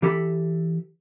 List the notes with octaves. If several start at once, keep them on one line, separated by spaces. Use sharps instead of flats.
E3 G4 A4 B5